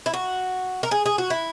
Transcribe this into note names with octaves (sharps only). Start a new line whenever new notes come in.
E4
F#4
A#4
G#4
G#4
F#4
E4